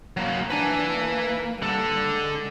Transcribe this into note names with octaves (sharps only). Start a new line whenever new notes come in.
F#3 A#3
D4 B4 G#5
A#3
D3 G3 A4
G#3